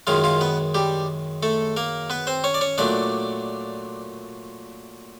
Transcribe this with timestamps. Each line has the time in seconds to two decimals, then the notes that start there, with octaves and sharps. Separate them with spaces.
0.07 F#2 D#3 G#3 F4 F5
0.24 F4 F5
0.41 B3 B4
0.74 G3 G4
1.43 A3 A4
1.77 A#3 A#4
2.10 B3 B4
2.27 C4 C5
2.44 C#4 C#5
2.54 D5
2.61 C#4 C#5
2.78 A#2 F#3 A3 D4 D5